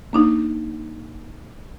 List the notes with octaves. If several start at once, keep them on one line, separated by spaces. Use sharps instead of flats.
A#3 D4 D#4